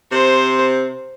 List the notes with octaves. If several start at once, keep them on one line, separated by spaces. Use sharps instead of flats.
C3 C5